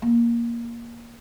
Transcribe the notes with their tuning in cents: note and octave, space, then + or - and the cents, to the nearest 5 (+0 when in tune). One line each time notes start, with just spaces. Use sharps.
A#3 +10